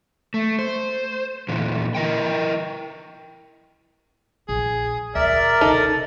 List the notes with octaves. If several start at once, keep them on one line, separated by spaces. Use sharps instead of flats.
A3
C5
A#2 D3 E3
E4 A#4 D#5 G5
A#1 G#4
D2 A#2 A#4 D5 E5
C#2 B2 D#4 A4